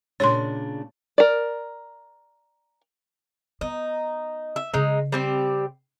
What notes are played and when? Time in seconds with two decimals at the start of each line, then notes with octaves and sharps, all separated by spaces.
0.20 A#2 C#3 D4 C#5 C6
1.18 A#4 D5
3.61 B3 D#4
4.56 E5
4.74 C#3 G#3 D#4
5.12 G3 C4 G4